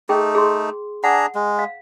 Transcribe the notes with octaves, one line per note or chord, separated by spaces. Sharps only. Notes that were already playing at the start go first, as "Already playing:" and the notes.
A3 D#4 G#4 G5
G#4 C6
D4 G#4 F#5 A#5
G#3
F5